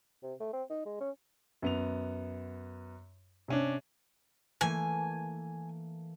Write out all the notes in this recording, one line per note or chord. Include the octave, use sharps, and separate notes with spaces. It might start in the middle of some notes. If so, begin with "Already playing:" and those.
C3
A3
C4
D#4
G#3
C#4
F#2 B3 F7
C3 C#4 D4
E3 A3 A#3 G#5